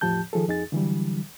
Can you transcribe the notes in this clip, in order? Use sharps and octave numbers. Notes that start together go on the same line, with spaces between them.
E2 A2 F3 G4 A5 G6
D#3 F3 G#4 A4
F2 D#4 G#4 A6
D3 E3 F#3 G3